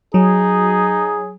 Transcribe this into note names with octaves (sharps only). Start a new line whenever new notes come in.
F#3 D#4 G#4